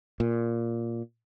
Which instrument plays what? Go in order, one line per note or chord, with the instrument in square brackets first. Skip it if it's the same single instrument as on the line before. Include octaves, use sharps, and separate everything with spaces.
[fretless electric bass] A#2